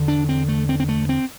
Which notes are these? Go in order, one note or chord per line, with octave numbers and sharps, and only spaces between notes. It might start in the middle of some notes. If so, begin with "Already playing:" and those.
Already playing: E2 D3
D4
C4
A3
C4
C4
A3
C4